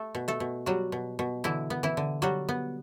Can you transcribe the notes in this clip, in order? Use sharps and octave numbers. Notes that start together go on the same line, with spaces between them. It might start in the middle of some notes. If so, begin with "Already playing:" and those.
Already playing: A3 A4
B2
A3 A4
B2
F#3 G3 F#4
B2
B2
D3 E3 E4
B3
E3 E4
D3
F#3 G3 F#4
B3